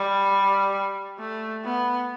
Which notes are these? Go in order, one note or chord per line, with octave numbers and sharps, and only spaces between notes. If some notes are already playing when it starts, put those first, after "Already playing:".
Already playing: G3
A3
B3